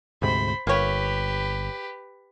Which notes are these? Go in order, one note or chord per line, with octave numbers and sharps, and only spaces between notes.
D2 G#2 C3 C5 B5
G1 A#3 G4 B4 C#5